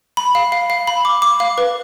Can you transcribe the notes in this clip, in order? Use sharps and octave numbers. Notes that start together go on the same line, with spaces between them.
B5
F5
F5
F5
B5
D6
D6
F5
B4